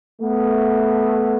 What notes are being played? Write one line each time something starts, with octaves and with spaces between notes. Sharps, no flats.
A3 B3